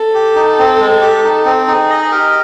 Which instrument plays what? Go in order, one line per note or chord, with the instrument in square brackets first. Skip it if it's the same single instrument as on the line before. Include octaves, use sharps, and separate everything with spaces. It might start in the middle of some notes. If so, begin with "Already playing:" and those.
Already playing: [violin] A4
[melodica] G4
D#4
C4
G#3
G4
D#4
C4
[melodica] D#4 [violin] G#4
[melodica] D#5
[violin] G4 [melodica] A#4